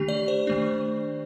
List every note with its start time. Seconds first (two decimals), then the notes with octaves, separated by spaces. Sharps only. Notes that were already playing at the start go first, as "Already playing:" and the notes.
Already playing: D#3 A3 D4 G4
0.08 D5
0.28 C5
0.47 D#3 A3 D4